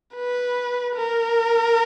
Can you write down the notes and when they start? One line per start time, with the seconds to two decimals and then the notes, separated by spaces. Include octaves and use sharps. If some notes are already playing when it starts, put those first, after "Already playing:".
0.15 B4
0.96 A#4